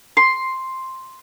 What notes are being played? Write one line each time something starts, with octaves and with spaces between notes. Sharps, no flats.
C6